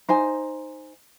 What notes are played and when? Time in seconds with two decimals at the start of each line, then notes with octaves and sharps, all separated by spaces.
0.09 D#4 C5 G#5